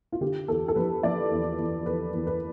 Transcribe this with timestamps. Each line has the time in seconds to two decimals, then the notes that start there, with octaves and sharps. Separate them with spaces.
0.12 F4
0.21 D3 G4
0.48 E2 A4
0.68 A4
0.76 F3 B4
1.03 F3 D5
1.31 E2
1.59 E2
1.85 E2 B4
2.14 E2
2.27 B4